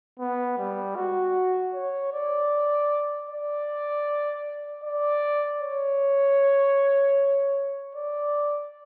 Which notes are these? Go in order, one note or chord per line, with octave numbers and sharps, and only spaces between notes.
B3
G3
F#4
C#5
D5
D5
D5
C#5
D5